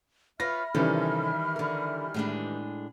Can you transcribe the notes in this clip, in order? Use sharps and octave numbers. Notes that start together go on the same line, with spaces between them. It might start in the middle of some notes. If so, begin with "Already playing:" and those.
F4 B4 C#5 E5 B5 F6 A#6
C3 D#3 E3 G3 C#4 A4
D3 A#4
A2 G#3 D4